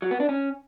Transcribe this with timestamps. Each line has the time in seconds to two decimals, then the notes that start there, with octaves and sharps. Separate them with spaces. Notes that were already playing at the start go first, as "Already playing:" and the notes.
0.02 F#3
0.11 B3
0.20 D4
0.29 C#4